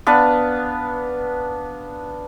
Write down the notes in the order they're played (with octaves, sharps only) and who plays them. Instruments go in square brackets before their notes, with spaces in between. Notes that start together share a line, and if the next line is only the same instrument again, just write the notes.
[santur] B3 D4 B4 F5